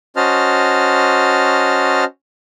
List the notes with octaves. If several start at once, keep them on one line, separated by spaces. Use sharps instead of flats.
C#4 F#4 C5 D#5 A5 F6